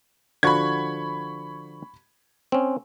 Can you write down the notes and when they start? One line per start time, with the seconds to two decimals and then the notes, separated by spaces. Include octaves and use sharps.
0.43 D3 F3 F#4 B5 C#6 G#6
2.52 C4 C#4